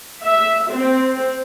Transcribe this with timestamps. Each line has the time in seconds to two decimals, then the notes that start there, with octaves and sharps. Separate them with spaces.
0.24 E5
0.72 C4